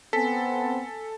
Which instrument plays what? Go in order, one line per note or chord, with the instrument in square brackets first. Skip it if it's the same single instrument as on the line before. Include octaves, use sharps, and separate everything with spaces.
[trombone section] B3 C4 [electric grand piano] A4 [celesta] G#5 B6